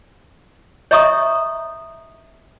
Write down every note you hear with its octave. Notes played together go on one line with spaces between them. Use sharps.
C#5 D#5 E5 A#5 C#6 D#6